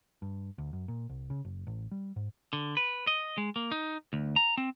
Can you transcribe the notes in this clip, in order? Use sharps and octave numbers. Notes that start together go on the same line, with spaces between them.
G2
D2
F#2
A#2
C2
C#3
F#1
A1
G3
G#2
D3
B4
D#5
G#3
A#3
D#4
D2
A#5
C4